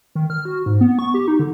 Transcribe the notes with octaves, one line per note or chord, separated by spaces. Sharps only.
D#3
F6
F#4
G#2
B3
C#6
G4
D#4
D3